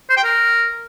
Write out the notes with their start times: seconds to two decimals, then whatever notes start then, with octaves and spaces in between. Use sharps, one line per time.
0.10 C5
0.17 G5
0.24 A#4